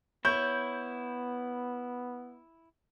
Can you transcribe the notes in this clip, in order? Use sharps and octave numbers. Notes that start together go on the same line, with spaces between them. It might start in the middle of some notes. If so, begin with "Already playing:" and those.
B3 E4 C#5 G6